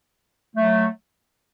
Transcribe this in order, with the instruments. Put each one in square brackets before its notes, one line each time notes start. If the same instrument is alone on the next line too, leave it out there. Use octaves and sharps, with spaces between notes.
[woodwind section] F#3 A3